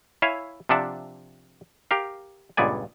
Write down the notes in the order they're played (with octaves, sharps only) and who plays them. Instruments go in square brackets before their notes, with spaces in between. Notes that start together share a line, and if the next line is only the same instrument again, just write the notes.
[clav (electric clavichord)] E4 C#5 E5 F5 G#5
C3 F3 D4 E5 F#5 A5
G4 A#4 F5
C#2 G2 A#2 B3 D5 G#5